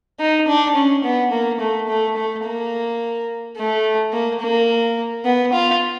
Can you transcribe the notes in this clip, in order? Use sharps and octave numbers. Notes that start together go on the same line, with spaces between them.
D#4
D4
C#4
B3
A#3
A3
A3
A3
A#3
A3
A#3
A#3
B3
F4